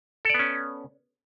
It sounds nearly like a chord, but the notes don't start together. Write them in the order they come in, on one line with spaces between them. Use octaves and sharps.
A4 D5 B3 C#4